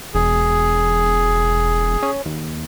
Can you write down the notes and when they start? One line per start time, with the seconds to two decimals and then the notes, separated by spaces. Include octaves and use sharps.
0.14 E1 G#4
2.03 C#4
2.26 D#2